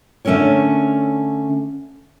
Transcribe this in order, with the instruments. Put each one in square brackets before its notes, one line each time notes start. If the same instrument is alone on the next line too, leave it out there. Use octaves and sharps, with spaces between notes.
[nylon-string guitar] D3 A3 C#4 A4 A#4 C#5